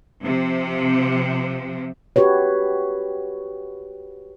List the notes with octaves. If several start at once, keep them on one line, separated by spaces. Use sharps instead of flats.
C3 F3
F#4 G4 B4 C#5